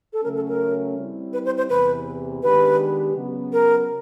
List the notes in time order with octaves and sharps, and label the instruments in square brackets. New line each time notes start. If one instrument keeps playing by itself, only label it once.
[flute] A4
[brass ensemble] C#3 F#3 A3 C#4 [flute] A#4
[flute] A4
A#4
[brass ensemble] G3 C4 E4
[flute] B4
C5
C5
[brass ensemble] E2 C3 E3 [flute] B4
[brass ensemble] D#3 G#3 B3 D4 G4 [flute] B4
[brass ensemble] C#3 F#3 B3
[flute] A#4